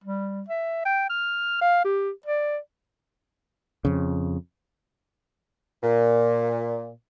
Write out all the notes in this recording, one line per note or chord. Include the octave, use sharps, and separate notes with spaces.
G3
E5
G5
F6
F5
G4
D5
F2 C#3
A#2